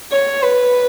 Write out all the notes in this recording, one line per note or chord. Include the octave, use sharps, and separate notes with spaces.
C#5
B4